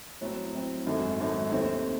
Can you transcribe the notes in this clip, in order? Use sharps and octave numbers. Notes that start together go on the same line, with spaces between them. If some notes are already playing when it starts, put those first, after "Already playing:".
A2 F#3 C4
A2 F#3 C4
G#1 F#2 D#3 A3
G#1 F#2 D#3 A3
D#2 D#3 A3 C4